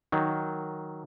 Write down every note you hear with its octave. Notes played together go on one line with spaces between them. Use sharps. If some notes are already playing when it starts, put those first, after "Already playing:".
D#3 F#3